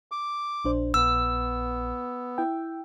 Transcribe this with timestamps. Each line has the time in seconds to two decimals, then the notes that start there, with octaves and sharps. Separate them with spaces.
0.12 D6
0.65 A#1 D4 C5
0.94 A#1 B3 E6
2.38 E4 G5